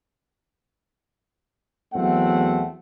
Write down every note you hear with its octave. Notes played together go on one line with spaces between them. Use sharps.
E2 F#3 A3 C4 F#5